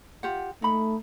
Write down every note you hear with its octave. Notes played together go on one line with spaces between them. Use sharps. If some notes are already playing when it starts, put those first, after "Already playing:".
F4 G4 F#5
A3 D#4 B5